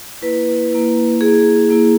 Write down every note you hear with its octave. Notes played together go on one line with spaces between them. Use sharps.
A#3 E4 B4
A#3 E4
A#3 E4 G#4
A#3 E4